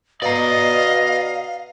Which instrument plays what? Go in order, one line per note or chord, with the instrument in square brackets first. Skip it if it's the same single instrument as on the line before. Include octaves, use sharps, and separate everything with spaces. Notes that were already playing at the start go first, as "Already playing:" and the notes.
[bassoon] B2 [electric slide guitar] D5 A#5 [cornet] D#5 [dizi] F5